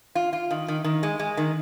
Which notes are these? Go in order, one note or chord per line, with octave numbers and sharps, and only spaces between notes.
F4
F4
D#3
D#3
D#3
G#3
G#3
D#3